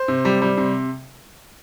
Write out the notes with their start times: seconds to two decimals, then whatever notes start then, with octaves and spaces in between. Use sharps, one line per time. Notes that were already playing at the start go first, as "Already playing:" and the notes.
Already playing: C5
0.08 C3
0.25 G3
0.42 G3
0.57 C3